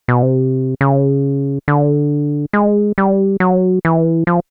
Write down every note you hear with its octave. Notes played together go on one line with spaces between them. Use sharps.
B2
C3
C#3
D3
G#3
G3
F#3
E3
F3